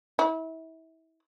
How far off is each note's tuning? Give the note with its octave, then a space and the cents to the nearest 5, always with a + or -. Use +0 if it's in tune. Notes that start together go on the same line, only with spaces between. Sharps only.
E4 -30